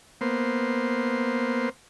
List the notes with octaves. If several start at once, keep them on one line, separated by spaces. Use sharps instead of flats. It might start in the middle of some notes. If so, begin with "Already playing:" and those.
A#3 B3 C5